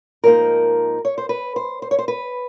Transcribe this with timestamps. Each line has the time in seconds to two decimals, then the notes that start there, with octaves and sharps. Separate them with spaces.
0.24 G#2 F3 A#3 D#4 A#4
1.05 C#5
1.18 C5
1.29 B4
1.56 C5
1.82 C5
1.91 C#5
1.99 C5
2.08 B4